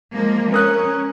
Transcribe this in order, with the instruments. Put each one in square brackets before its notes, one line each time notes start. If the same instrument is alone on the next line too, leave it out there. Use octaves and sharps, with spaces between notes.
[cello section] F3 G#3 A#3
[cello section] C#4 [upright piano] A#4 D#6 F#6